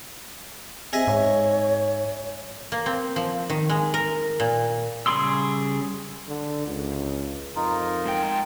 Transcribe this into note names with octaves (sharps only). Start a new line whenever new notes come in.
C4 G#4 D#5 E5
G#2 C#5
A#3
C4
F3
D#3
G#3
A#4
A#2
C#3 G3 G#4 C6 E6
D3
C#2
F2 D#4 F4 A#4
G#2 G5